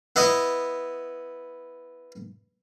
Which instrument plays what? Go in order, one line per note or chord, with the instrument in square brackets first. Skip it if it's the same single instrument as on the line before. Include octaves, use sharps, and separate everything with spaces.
[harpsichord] B3 E4 D#5